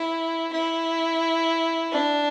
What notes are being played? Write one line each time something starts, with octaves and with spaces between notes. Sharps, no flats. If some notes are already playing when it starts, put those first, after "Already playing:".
Already playing: E4
E4
D4